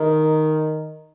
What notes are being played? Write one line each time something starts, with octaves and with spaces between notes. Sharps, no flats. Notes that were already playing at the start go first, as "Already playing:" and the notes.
Already playing: D#3